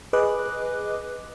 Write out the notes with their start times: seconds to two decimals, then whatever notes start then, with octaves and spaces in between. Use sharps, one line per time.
0.13 G#4 B4 D#5 D6 F#6